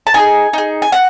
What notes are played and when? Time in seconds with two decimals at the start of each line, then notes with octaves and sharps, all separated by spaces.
0.07 A5
0.14 D#4 G#4 G#5
0.53 D#4 G#4
0.82 G#5
0.92 F#4 F#5